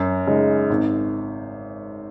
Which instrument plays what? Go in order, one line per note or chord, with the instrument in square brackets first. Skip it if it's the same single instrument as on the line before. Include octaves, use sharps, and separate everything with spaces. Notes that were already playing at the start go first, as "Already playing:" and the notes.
Already playing: [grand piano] F#2
C#3 G#3 D#4
G#1